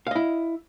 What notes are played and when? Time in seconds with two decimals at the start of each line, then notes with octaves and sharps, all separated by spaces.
0.07 F5
0.11 D#5
0.15 E4